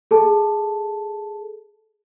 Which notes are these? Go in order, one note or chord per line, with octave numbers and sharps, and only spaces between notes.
G#4 A4 A5